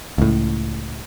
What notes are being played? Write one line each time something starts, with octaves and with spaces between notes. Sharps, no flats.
C#2 A2